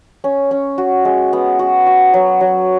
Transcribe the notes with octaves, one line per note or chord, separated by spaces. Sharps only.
C#4
C#4
F#4
G#3
B3
F#4
F#4
F#3
F#3